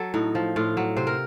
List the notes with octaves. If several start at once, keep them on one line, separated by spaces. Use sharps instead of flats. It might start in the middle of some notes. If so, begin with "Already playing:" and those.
Already playing: F#3 A4
A2 D#4
F3
A2 F4
F#3
C3 C5
A#4